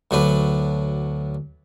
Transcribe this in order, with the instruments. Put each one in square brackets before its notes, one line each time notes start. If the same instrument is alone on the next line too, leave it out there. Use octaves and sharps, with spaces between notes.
[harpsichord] D2 F#3 D4 B4